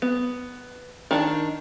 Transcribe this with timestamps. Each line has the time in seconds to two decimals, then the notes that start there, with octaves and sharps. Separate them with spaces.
0.02 B3
1.11 D#3 D4